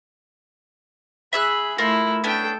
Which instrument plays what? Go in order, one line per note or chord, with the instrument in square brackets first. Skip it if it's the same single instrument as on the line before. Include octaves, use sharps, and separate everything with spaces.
[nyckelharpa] G#4 B5 [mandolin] E5 E6 F#6
[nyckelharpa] A3 E4 [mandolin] F4 A#4 C6
[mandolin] B3 C#4 D4 [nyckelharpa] A4 G5